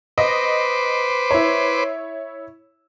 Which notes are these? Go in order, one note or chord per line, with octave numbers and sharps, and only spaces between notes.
B4 C5 D#5 D6
E4 C#5